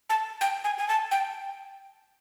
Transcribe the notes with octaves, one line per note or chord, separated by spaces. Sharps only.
A5
G5
G#5
G#5
A5
G5